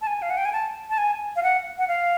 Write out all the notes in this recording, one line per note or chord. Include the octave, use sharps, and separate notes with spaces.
A5
G#5
F5
F#5
G5
G#5
A5
A5
G#5
F5
F#5
F#5
F5